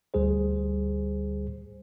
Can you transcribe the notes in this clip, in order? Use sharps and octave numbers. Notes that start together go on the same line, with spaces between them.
D2 G3 G#4 C5